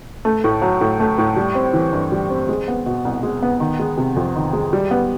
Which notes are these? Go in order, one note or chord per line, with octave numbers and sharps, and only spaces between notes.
A3
A2
F#3
A2
A3
A2
G3
C4
E3
G2
G3
C4
G#3
B3
B2
C2
G#3
B3
D#3
G#3
C3
F2
D#3
G#3
G3
B3